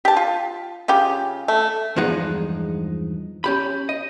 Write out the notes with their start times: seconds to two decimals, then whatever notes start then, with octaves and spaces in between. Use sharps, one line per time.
0.05 G4 A5
0.17 F4
0.88 C#3 F4 G4
1.48 A3
1.96 E2 G2 F3 G#3 D#4 F#5
3.44 C#4 G4 B5
3.89 D#5